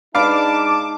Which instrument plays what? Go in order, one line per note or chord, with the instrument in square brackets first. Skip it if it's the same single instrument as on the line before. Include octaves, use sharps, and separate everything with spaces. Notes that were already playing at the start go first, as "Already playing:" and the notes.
[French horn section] G#3 D#4 [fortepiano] D4 B4 F5 [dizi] A5 [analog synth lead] D6